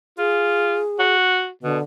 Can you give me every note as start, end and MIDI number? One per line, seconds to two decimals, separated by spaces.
0.18 0.80 65
0.18 1.16 68
1.00 1.50 66
1.63 1.78 47
1.63 1.82 50